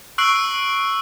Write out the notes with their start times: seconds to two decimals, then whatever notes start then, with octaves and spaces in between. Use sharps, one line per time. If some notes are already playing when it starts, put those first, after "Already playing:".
0.18 C#6 E6 F#6 C7 D7 F#7